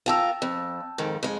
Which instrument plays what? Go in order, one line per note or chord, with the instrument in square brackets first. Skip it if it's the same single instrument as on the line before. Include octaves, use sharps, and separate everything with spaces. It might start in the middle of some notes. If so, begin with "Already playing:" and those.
[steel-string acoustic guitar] F4 G#4 A#4 [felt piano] G5 A5 E6
[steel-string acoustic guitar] F2
F2 G#2 D#3
F2 G#3